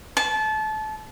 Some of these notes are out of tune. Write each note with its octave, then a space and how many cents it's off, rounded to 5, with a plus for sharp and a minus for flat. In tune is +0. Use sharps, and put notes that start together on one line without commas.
A5 -25